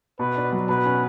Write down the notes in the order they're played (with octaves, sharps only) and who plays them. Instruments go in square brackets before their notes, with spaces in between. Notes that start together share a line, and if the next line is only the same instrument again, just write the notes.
[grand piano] B2 [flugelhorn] B4
[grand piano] D4
F#3
[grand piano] B2 [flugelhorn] B4
[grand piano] C#4